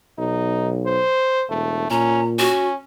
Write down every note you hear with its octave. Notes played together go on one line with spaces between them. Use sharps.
B1 D#4
C5
E1 A3
A#2 C#4 A#5
C#4 F#4